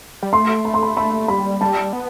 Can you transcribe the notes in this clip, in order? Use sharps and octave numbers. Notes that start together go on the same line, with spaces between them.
G3
A3 C6
B5
C6
B5
A3 B5
G3 B5
G3 A5
B3